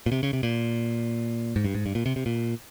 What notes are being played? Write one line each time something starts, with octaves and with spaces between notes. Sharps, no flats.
A#2
C3
C#3
C3
A#2
G#2
G2
G#2
G2
A#2
C3
C3
A#2